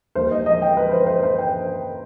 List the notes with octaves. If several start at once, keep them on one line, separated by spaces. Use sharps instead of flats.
D#2 D#3 G3 C5
D#5
D#5
G5
B4
C5
C5
C5
G5